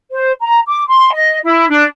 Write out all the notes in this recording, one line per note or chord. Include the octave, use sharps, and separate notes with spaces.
C5
A#5
D6
C6
D#5
E4
D4